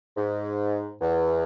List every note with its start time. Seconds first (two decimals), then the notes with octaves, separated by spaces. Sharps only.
0.17 G#2
1.01 E2